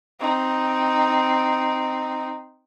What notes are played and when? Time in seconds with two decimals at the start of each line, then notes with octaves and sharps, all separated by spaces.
0.20 C4 D#4